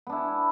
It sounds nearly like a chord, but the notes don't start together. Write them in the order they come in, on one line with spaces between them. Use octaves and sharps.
B3 D4 E4